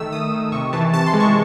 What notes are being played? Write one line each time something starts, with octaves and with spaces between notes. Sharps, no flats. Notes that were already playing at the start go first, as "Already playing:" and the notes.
Already playing: D#3 A3 E6
D#3 D#6
D#3
C3 C#6
E3 A5
C3 A5
C6
G#3
C#6